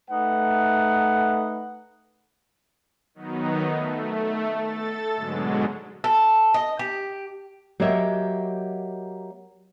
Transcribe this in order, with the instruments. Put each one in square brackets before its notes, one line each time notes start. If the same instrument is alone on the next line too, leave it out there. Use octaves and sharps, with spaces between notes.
[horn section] A3 D#4 B4 F#5
[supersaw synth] D#3 F#3 B3 D#4
A3
A4 A6
G#2 B2 D3 F#3 G#3
[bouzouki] A4
D#5
G4
[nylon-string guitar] F#3 A#3 G4 C#5 D#5 E5